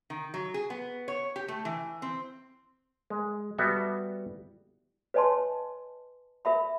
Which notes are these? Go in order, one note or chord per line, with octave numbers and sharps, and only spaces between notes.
D#3
F#3
G#4
B3
C#5
G4
A3
E3
C4
G#3
G3 B3 F#4 A4 E5
B4 C#5 D#5 G#5 A5 C6
A#4 E5 B5